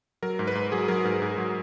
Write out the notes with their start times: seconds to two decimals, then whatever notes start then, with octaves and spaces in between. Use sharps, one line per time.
0.22 F#3 A#4
0.39 G#2
0.47 B4
0.55 G#2
0.72 F#3 G#4
0.88 F#3 A#4
1.05 G#2 G#4
1.22 G#2 G#4
1.38 F#3